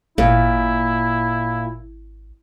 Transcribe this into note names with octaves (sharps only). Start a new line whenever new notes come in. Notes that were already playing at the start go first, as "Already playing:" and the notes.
G#1 A#2 E4